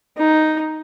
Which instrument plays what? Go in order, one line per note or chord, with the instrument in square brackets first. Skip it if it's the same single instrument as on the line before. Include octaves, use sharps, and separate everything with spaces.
[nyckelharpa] D#4